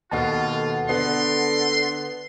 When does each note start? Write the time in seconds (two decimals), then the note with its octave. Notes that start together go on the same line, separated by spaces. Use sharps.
0.11 D#2 B2 F4 A4 F#5 A5
0.89 D3 B3 C6